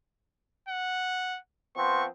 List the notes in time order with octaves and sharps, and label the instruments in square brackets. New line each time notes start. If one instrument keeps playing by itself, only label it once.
[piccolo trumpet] F#5
[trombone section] F3 B3 C4 [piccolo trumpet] C#6